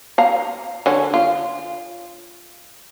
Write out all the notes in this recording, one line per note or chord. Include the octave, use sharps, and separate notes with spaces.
F5 A#5
D3 C#4
F4